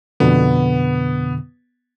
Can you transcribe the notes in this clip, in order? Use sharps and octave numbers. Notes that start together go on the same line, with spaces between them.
F2 B2 D3 B3